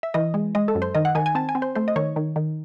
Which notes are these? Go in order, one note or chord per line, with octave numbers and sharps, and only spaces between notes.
E5
E3 D#5
G#3
G#3 D#5
A4
F#2
C5
D#3 D#5
F#5
D#3 G#5
G#5
C4 A5
G#5
C4
C5
A3 C5
D#5
D#3 C#5
D#3
D#3